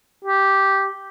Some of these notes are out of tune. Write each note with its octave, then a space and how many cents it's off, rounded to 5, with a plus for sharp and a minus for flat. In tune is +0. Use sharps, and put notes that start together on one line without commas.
G4 -5